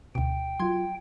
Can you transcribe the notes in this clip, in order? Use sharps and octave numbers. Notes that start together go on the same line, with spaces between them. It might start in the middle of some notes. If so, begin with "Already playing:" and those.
D2 B2 G5
F#3 F4 C6 G#6